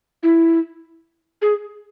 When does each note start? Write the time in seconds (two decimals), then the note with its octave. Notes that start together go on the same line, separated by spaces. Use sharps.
0.23 E4
1.42 G#4